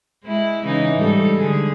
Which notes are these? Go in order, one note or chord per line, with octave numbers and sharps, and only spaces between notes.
G#3 E4
C#3 E3 D#4
G#2 G3 A4
D3 G#4